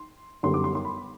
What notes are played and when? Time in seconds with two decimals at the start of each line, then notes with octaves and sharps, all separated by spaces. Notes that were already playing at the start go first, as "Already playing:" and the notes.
Already playing: C6
0.43 F#2 D3 G3 B3 C6
0.54 D6
0.64 C6
0.75 C6
0.85 B5